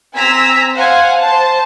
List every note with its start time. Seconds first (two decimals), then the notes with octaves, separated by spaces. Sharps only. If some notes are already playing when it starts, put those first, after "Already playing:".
0.14 C4 G#5 A#5 E6 B6
0.73 C5 F5 F#5 G#5
1.20 C5 A5